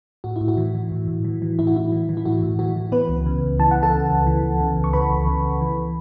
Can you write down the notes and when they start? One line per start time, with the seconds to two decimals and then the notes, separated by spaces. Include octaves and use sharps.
0.24 A2 F#4
0.36 E4
0.41 A2
0.48 F#4
0.57 E3
0.75 E3
0.91 A2
1.08 A2
1.25 E3
1.42 E3
1.59 A2 E4
1.67 F#4
1.75 A2 E4
1.92 E3
2.09 E3
2.17 E4
2.25 A2 F#4
2.43 A2
2.59 E3 F#4
2.76 E3
2.92 E3 B3 B4
3.09 C#2
3.26 C#3
3.43 C#2
3.59 E3 A5
3.71 F#5
3.76 C#2
3.83 A4 A5
3.93 C#3
4.10 C#2
4.27 E3
4.43 C#2
4.60 C#3
4.77 C#2
4.84 C#6
4.93 E3 B4 B5
5.10 C#2
5.27 C#3
5.44 C#2
5.61 E3